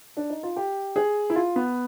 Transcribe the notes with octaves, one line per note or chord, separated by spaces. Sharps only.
D4
D#4
F4
G4
G#4
E4
F4
B3